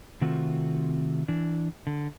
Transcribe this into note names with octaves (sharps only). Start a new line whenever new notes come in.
C3 D#3 A3 C4 F4 F#4
E3 D4
D3